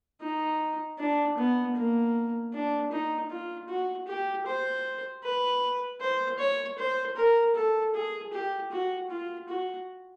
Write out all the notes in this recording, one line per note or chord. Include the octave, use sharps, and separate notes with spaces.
D#4
D4
B3
A#3
D4
D#4
F4
F#4
G4
C5
B4
C5
C#5
C5
A#4
A4
G#4
G4
F#4
F4
F#4